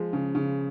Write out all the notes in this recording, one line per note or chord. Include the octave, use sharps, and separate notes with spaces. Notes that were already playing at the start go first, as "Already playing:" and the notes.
Already playing: F3 G#3
C#3
C#3